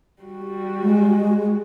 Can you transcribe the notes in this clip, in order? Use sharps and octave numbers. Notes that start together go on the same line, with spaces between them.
G3 F#4
G#3